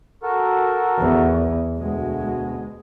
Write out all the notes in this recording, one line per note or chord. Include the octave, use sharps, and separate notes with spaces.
F#4 A4 A#4
E2
D2 B2 G#3